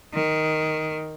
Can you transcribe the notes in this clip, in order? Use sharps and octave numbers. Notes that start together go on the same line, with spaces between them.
D#3